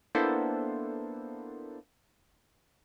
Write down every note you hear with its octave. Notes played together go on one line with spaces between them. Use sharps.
A#3 B3 D4 E4 A4 C5